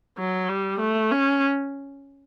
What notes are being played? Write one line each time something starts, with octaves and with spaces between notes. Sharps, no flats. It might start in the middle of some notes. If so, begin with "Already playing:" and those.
F#3
G3
A3
C#4